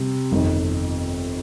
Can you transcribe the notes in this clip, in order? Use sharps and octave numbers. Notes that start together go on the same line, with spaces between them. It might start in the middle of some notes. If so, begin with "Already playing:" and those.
Already playing: C3 G3
G1 F2 D#3